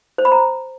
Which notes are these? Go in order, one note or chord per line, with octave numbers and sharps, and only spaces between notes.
C5
B5
A#5